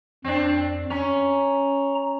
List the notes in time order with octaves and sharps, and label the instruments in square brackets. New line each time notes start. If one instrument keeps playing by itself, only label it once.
[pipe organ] F2 [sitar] C4 D4
[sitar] C#4 [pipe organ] A#5